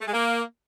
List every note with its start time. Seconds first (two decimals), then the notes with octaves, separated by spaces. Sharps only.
0.01 A3
0.07 G#3
0.13 A#3